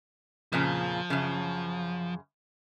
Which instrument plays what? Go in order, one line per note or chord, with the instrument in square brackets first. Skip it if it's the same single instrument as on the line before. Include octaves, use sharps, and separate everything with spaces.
[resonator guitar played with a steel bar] F2 A#2 C#3 [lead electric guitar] F3
[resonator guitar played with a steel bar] F#2 C#3